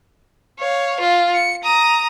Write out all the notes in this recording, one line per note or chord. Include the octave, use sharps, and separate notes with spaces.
C#5 F5
F4
C#7
A#5 D#6